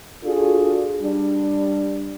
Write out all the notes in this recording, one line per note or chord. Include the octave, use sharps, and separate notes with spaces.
D4 F4 F#4 G#4 A4
G3 D4